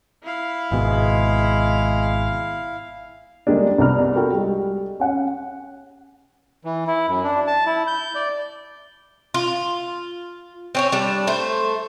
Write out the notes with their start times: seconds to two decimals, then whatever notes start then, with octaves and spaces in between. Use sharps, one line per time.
0.23 E4 F5
0.72 G#1 B2 G#3
3.47 D3 G3 G#3 A#3 D4
3.78 C2 B3 D4 A#5 F6
4.15 F#4 A4 A#4 G5
4.32 G3 G#3
5.00 C#4 F#5
6.65 E3
6.87 E4
7.08 F#2
7.24 D4
7.47 A5
7.66 E4
7.87 G6
8.15 D5
9.34 F4
10.75 C4 C#4 C#5
10.92 G3 D4
11.27 A3 C5